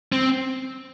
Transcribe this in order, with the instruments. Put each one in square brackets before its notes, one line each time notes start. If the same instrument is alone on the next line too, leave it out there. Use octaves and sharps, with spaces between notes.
[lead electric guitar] C4